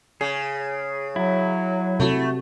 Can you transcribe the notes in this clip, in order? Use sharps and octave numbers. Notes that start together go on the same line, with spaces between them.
C#3 G#4
F#3 E4
C3 A3 F#4